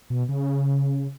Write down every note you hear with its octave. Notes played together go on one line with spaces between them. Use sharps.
B2
C#3